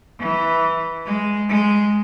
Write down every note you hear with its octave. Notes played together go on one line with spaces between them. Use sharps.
E3
G#3
G#3